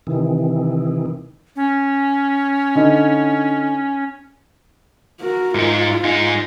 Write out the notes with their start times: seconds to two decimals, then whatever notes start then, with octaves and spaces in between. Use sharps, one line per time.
0.07 C3 D#3 E3
1.56 C#4
2.75 D3 D#4
5.21 F#4 A#4
5.55 G#2 D#4 F4
6.04 G#2 D#4